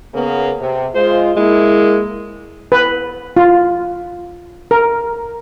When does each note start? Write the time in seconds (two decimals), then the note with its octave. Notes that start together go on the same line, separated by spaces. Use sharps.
0.14 C#3 A#3 B3
0.60 C3
0.95 G#3 F4 C5
1.36 G#3 A#3 E4
2.72 B4
3.37 F4
4.71 A#4